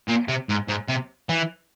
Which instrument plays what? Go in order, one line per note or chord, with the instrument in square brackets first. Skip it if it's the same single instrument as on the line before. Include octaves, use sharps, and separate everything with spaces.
[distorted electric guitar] A#2
C3
G#2
G#2
C3
E3